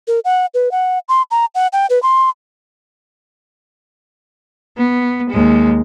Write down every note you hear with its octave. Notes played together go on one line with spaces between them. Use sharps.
A#4
F#5
B4
F#5
C6
A#5
F#5
G5
B4
C6
B3
D#2 G#3